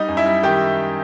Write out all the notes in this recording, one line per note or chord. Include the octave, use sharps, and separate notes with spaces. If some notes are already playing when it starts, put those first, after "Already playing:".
Already playing: G3 D#4 D#5
F#2
E4 E5
G3
D#3 G4 G5